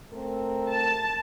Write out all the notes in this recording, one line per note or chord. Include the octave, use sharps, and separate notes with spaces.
A3 C4 A#4
A5